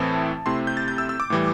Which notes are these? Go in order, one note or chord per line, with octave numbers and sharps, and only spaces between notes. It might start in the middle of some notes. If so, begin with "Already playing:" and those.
Already playing: A2 E3 C4 E4 A5
C3 A3 C4 E4 C6
G6
A6
G6
E6
E6
D6
A2 E3 G3